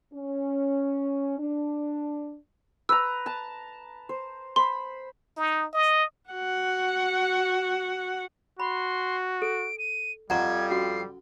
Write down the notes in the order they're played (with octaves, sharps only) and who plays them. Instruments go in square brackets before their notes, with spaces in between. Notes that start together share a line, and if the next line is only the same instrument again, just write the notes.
[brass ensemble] C#4
D4
[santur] B4 A#5 [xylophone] E6
[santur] A5 A#5
C5
[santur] C5 B5 [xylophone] C6
[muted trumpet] D#4
D#5
[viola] F#4 F#5
[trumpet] F#4 [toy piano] B5 [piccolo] C6
[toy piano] A4 [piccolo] D7
[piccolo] D#7
[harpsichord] F2 [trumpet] G3 [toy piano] F#5 A#5 C#6 [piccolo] G#6
[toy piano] C#4 F#4 [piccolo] C7